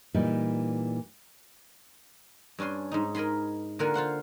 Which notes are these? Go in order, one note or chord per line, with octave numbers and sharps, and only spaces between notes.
A#2 E3 G3 D#4
G2 C#4 D4 G#5 C6
G#2 D#4
A#4 D#5 G#5 B5 C6
D3 A#3 F4 A#4 F#5 G#5
F4 C5 F#5 C6